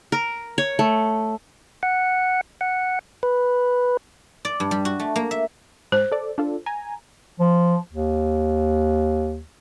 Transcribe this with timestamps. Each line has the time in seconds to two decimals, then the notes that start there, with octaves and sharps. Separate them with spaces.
0.12 A#4
0.58 C#5
0.79 A3
1.83 F#5
2.61 F#5
3.23 B4
4.45 D5
4.60 G2
4.71 G3
4.85 F#4
5.00 A3
5.16 A#3
5.31 E5
5.92 G#2 C5
6.12 A4 D5
6.38 D4 F4 A4
6.66 G#5 A#5
7.40 F3
7.93 D#2